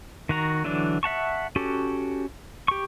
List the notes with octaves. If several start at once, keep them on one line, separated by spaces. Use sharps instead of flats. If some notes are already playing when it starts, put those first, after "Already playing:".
D#3 F#4 A#5
D3 E3 F#3 D4
E5 F#5 A5 C#6
C#4 F#4 G4 A4
G4 C#6